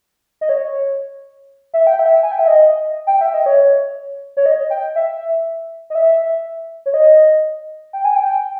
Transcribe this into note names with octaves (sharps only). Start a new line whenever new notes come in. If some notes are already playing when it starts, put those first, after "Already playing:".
D#5
C#5
E5
G5
E5
G#5
G5
E5
D#5
G5
E5
D#5
C#5
C#5
D#5
G5
E5
D#5
E5
C#5
D#5
G5
G#5
G5